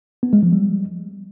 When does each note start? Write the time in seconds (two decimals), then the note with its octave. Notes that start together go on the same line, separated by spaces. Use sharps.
0.23 B3
0.33 G#3
0.43 F3
0.53 G3